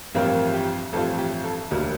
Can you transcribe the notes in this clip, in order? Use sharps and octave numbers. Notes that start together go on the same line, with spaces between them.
A1 G2 F3 A#3 C4 F4 A#4
G4
A1 G2 F3 C4 F4 A4
G4
A4
E1 D2 D3 G3 A#3 A#4